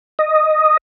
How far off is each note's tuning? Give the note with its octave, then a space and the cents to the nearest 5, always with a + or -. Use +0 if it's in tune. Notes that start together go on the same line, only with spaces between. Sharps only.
D#5 -5